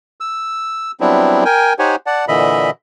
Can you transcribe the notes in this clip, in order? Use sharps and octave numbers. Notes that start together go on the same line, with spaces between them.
E6
F#3 G3 B3 C4 D4 E4
A#4 G5 G#5
D#4 G4 C5 C#5 F#5 G#5
D5 F#5 A5
A#2 D3 E3 D#5 E5 B5